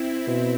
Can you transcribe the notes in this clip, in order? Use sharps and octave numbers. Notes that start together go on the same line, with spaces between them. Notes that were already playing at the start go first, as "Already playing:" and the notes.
Already playing: C4 E4
B2